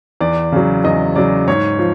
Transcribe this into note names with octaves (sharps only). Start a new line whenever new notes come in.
E2 D5
C#3 F#3
E2 D#5
C#3 F#3 D5
G#2 C#5
F3